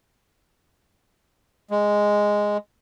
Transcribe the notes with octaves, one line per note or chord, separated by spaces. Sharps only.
G#3